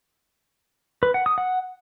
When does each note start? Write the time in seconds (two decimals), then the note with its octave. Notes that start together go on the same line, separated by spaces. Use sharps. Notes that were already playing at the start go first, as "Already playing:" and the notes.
1.03 B4
1.14 F#5
1.26 D#6
1.38 F#5